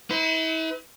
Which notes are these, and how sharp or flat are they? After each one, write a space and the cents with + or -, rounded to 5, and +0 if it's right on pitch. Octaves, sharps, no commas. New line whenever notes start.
E4 -40 B4 +45